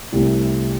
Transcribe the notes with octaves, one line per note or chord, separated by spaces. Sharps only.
C2 C3 A3